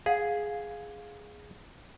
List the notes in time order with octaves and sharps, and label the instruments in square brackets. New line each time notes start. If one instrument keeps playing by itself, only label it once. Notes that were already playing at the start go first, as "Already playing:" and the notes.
[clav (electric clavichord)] G#4 [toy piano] F5 F#5